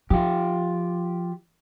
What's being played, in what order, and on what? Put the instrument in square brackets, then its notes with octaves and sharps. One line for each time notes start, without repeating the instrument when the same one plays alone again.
[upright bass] F3 [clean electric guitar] F4 G4